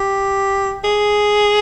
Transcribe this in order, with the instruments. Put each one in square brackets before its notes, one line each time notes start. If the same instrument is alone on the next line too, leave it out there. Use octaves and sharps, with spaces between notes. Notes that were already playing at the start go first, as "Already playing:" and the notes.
Already playing: [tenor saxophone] G4
G#4